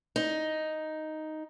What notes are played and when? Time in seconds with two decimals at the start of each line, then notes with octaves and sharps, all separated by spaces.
0.16 D#4